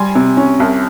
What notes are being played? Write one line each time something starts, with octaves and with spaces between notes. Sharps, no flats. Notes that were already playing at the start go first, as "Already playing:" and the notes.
Already playing: G3 G#5 C6
C3
C#4
C2